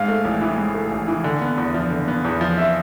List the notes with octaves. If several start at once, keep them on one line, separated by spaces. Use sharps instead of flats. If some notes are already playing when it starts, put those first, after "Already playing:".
Already playing: G#2 F5
A3
A1
E3
G#2
A3
A1
E3
D3
B3
E2
F3
D3
B3
E2
F3
E5